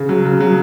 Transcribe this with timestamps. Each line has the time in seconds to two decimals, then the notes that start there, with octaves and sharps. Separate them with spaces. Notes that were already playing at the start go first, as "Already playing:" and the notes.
Already playing: C#3
0.09 F#3
0.25 C#3
0.40 F#3